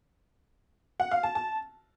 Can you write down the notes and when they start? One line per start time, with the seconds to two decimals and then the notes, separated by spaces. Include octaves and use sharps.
1.00 F#5
1.11 F5
1.23 A5
1.35 A5